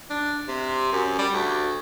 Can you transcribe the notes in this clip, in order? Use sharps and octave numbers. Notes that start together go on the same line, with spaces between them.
D4
C3
F#2
G3
D2